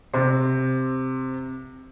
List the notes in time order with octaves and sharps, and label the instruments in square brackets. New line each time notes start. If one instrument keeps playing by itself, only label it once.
[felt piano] C3 C4